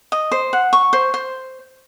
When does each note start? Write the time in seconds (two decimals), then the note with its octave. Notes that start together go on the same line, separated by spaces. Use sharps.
0.12 D#5
0.32 C5
0.53 F#5
0.73 C#6
0.93 C5
1.14 C5